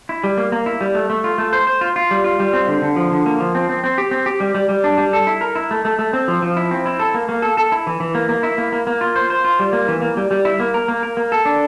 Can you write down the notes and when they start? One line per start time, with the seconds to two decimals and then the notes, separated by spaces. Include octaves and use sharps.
0.09 E4
0.24 G3
0.38 A#3
0.52 A#3
0.66 E4
0.81 G3
0.95 A3
1.10 A3
1.24 F4
1.38 A3
1.53 C5
1.67 C5
1.81 F4
1.96 F4
2.11 G3
2.24 F4
2.40 G3
2.53 C4
2.68 D3
2.82 D3
2.96 F3
3.11 D3
3.26 A#3
3.40 F3
3.55 C4
3.69 C4
3.84 C4
3.98 G4
4.11 C4
4.26 G4
4.40 G3
4.55 G3
4.69 G3
4.84 D4
4.98 G3
5.13 A4
5.27 E4
5.41 A#4
5.55 E4
5.71 A3
5.85 A3
5.99 A3
6.13 C4
6.28 F3
6.42 F3
6.57 E4
6.71 C4
6.86 E4
6.99 A4
7.14 A#3
7.29 A#3
7.42 A4
7.57 A4
7.72 E4
7.87 E3
8.00 E3
8.15 A#3
8.29 A#3
8.43 E4
8.58 A#3
8.72 A#3
8.87 A#3
9.01 F4
9.16 C5
9.30 C5
9.44 F4
9.59 G3
9.73 A#3
9.88 E3
10.02 A#3
10.17 G3
10.31 G3
10.45 E4
10.60 A#3
10.74 A#4
10.88 A#3
11.03 A#4
11.17 A#3
11.32 A4
11.46 D4